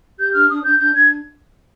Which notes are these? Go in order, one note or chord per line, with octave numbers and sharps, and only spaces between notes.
G4 G6
D4 F6
D4 D#6
D4 G6
D4 G6
D4 G#6